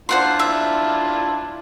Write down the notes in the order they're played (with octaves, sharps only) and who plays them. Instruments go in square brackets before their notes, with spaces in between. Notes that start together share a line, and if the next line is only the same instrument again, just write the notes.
[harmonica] D4 E4 F4 [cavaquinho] C5 F#5 C6
[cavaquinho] E5